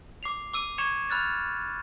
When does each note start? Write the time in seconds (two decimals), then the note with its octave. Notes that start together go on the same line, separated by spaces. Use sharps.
0.23 D6 C7 F7
0.54 D6 E6 D#7
0.78 C#6 D6 G#6 C#7 E7 F7
1.10 B5 F6 F#6 A6